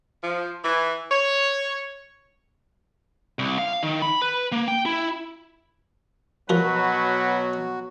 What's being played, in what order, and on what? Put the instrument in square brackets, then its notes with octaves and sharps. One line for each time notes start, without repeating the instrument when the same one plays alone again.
[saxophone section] F3
E3
C#5
[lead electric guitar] C2
F5
D#3
B5
B4
A#3
G5
E4
[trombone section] B2 F#3 [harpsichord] F3 A#4 [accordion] F#4 [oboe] B4